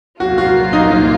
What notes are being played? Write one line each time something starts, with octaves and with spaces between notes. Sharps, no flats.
C2 A#2 F#3 A#3 F4 F#4
F#4
D#4
D#4